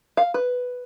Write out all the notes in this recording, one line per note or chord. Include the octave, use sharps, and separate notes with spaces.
F5
B4